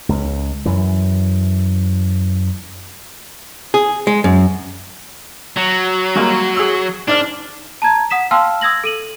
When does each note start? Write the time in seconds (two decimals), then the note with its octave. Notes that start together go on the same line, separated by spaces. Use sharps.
0.09 C#2
0.66 F#2 E3
3.74 G#4
4.07 G#3
4.24 F#2
5.57 F#3
6.16 G3 G#3 A#3
6.57 G#4 E6
7.08 G#2 D4 D5 F6
7.82 A5 A#5 G#6
8.10 F#5 D#6 B6 E7
8.31 F5 G5 A5 C6 E6 F6
8.61 D#6 E6 G#6 A#6 F#7
8.84 A4 D#7 F#7